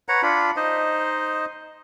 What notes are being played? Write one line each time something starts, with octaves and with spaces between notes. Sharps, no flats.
B4 C#5 F#5 A#5
D4 F4 B5
D#4 C5 D#5